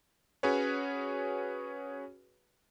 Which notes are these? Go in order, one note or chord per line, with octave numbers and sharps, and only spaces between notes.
C#4 F#4 G#4 B4 C#5